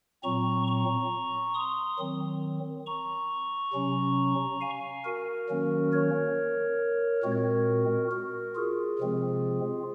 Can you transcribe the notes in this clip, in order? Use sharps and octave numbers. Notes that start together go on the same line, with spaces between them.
A#2 F#3 C4 A#5 C#6
A#5 C#6
C6 D#6
D#3 F#3 C4
A#5 C#6
C3 F#3 C#4
F5 G#5
F#4 A#4
D#3 F#3 A#3 C#4
A#4 C#5
A#2 G#3 C4 F#4 A#4
F#4 A#4
F4 G#4
C3 F3 G#3 C4